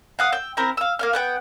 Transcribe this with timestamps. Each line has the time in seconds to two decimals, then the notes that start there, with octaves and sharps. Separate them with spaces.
0.19 F5 F#5 D#6
0.32 G5 E6
0.57 C4 E4 A#4 C5
0.77 F5 E6
0.99 A#3 F5 F6
1.13 B3 F#5 G5